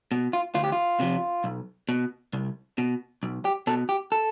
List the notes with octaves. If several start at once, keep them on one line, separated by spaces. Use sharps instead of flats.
B2
F4
D2 F4
G4
F4
C3 F3
B1
B2
C2
B2
B1
G4
B2 A4
G4
A4